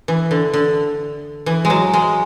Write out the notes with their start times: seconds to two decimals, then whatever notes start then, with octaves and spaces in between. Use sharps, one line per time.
0.08 E3
0.31 D3
0.54 D3
1.46 E3
1.65 G#3
1.70 F#3
1.94 G#3